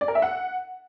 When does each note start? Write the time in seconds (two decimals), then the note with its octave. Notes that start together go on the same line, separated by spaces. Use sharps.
0.01 D5
0.08 A#4
0.15 E5
0.22 F#5